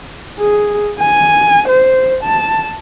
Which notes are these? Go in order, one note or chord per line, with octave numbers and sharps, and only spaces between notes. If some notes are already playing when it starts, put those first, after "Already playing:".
G#4
G#5
C5
A5